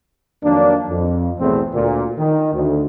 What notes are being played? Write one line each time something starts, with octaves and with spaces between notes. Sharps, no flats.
F2 D#3 F#3 A#3 D4
F2
B1 E2 A2 A3 C4 G#4
D2 A#2
D#3
D2